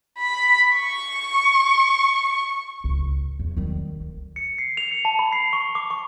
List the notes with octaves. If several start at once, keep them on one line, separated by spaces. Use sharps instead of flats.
B5
C#6
C#2 A2
E2
D#3 G3
D2
C#7
C7
F7
C#7
A5
B5
C7
C#6
D6
C#6